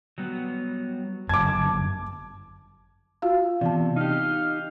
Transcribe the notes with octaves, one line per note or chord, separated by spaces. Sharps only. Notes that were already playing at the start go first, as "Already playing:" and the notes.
F#3 G3 B3
G1 F#2 A5 D6 G#6
F4 F#4 F5
C3 E3 B3 A5
D#4 G4 F5